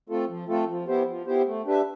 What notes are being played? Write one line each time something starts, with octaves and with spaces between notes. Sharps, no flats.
A3 C4 F4 A4
F3
A3 C4 F4 A4
F3
B3 E4 G4 C5
F3
B3 E4 G4 C5
A3
D4 G4 B4 E5